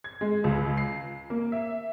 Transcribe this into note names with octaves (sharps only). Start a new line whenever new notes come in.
G#6
G#3
C#2
C7
A#3
E5